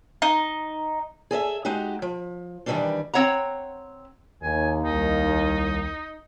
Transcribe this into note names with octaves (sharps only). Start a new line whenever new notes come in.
D#4
G#4 A4 D#5 E5
G#3 D#4 F#4 G4
F3
D#3 E3 F#3 G3 C#4 D4
C4 C#5 F#5 A#5
D#2 G#5
C2 D#3 D#4